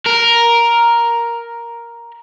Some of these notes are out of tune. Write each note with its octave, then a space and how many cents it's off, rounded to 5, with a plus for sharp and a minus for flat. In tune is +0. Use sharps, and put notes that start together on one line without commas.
A#4 +5